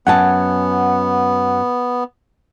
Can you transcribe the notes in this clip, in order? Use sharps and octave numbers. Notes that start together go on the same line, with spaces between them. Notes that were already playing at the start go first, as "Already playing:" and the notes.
F#2 B3 C#5 F#5 A5